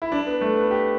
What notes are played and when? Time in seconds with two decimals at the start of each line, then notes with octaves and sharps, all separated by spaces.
0.02 E4
0.12 D4
0.26 B3
0.41 A3
0.56 B3
0.71 G4